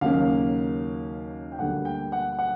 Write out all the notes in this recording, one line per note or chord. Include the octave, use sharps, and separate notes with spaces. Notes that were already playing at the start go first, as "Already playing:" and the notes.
D#2 C#3 F#3 A#3 C#4 F5
G5
D2 D3 G3 A#3 F#5
G5
F#5
F#5